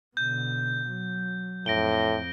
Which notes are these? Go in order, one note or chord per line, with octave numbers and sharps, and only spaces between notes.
B2 D3 G6
F#3
F2 A2 A#6 D7 G7